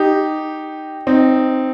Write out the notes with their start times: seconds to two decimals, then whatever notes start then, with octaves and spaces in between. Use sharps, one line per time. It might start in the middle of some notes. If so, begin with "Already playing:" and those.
Already playing: D#4 G4
1.07 C4 D#4